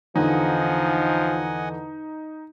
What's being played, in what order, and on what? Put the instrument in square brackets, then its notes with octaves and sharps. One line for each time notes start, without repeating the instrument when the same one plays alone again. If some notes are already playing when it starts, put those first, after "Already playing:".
[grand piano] E2 D3 [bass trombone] F3 [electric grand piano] D#4 [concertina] D#5 F#5 G#5